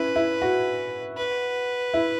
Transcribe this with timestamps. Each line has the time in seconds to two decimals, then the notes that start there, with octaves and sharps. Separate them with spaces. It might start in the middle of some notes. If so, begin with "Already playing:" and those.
Already playing: C#4 E4 B4
0.16 E4
0.42 F#4
1.17 B4
1.94 E4